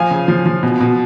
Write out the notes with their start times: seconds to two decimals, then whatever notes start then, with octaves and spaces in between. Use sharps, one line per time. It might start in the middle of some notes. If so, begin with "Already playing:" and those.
Already playing: F3 F5 G#5
0.11 C#3
0.28 F3
0.46 F3
0.63 B2
0.80 B2